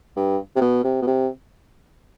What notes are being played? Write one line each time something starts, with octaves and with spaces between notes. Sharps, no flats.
G2
C3
B2
C3
B2
C3